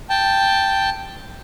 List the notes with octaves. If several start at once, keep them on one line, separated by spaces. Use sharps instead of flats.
G5 A5